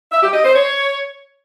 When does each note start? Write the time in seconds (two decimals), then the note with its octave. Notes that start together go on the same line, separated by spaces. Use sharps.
0.12 E5
0.23 G4
0.34 D#5
0.44 C5
0.55 C#5